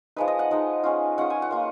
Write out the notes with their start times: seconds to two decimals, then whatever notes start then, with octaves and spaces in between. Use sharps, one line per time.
0.16 F3 G#3 D#4 B4
0.28 D#5
0.39 F#5
0.51 F3 G#3 D#4
0.84 G#3 C#4 F4
1.18 G#3 C#4 F4 F#5
1.30 G#5
1.42 F#5
1.51 A#3 F4